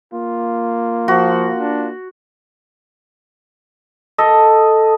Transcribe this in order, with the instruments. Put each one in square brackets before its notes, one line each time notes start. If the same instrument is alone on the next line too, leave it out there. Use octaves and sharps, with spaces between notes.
[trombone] A#3 [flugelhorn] F4
[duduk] F3 [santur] F#4
[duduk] D4
[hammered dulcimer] A4 D#5